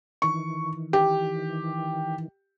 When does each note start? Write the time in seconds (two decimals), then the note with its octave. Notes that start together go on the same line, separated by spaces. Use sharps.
0.22 D#3 E3 C#6
0.93 G4